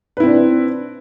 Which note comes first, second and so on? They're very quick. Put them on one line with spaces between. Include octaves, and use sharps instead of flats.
B4 E4 C4 D4